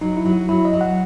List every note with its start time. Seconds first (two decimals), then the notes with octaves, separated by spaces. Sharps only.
0.01 F#3 D#4
0.17 E4
0.25 F#3
0.33 F#4
0.49 F#3 E4
0.65 D#5
0.73 F#3
0.81 F#5